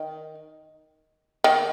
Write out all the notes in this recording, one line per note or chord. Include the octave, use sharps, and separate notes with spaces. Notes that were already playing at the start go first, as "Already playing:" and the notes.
Already playing: D#3
D#3